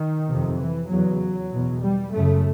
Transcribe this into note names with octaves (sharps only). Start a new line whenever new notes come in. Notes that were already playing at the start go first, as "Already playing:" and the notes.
Already playing: D#3
F2 C3
E3
E2 C#3 F#3
E2 B2
G3
F#2 C#3 A3